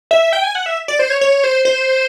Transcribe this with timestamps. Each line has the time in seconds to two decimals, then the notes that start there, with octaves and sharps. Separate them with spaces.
0.11 E5
0.33 G5
0.43 G#5
0.55 F#5
0.66 E5
0.88 D5
0.99 C5
1.10 C#5
1.21 C#5
1.44 C5
1.65 C5